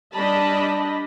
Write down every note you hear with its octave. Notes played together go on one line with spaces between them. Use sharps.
G3 D4 D#5 A5 B5